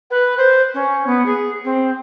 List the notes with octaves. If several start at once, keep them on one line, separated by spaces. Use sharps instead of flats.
B4
C5
C#4
B3
G#4
C4